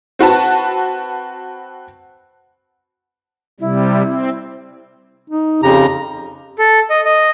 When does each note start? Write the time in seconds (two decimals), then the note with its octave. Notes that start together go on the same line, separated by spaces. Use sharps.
0.19 C4 F#4 B4 A5
3.60 C3 G3 E4
4.05 C4
5.30 D#4
5.63 F2 C#3 G4 A#5
6.58 A4
6.90 D#5
7.06 D#5